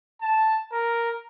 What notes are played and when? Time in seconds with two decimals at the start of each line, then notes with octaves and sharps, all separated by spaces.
0.21 A5
0.72 A#4